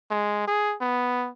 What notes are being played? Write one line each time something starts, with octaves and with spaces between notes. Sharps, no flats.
G#3
G#4
B3